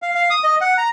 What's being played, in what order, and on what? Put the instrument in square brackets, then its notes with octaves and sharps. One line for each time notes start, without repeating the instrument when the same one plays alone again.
[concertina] F5
F5
D#6
D#5
F#5
A#5